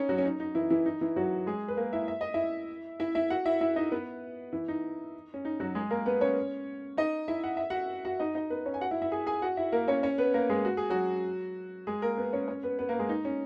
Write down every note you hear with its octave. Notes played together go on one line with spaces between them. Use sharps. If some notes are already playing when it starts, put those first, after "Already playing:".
Already playing: C#4 D#4 C#5
F#3 F#4
C#4
D#4
D#4
E3 E4
E3 E4
D#4
E3 E4
F#3 F#4
G#3 G#4
B4
A#3 A#4
E4 E5
E5
D#5
E4 E5
E4 E5
E4 E5
F#4 F#5
E4 E5
E4 E5
D#4 D#5
B3 B4
E3 E4
D#4
C#4
D#4
F#3 F#4
G#3 G#4
A#3 A#4
B3 B4
C#4 C#5
D#4 D#5
E4 E5
F#5
E5
F#4 F#5
F#4 F#5
D#4 D#5
D#4 D#5
B3 B4
C#4 C#5
G#5
F#4 F#5
E4 E5
E4 E5
G#4 G#5
G#4 G#5
F#4 F#5
E4 E5
A#3 A#4
C#4 C#5
C#4 C#5
B3 B4
A#3 A#4
G#3 G#4
F#4
G#4
F#3 F#4
G#3 G#4
A#3 A#4
B3 B4
C#4 C#5
C#4 C#5
B3 B4
B3 B4
A#3 A#4
G#3 G#4
D#4
C#4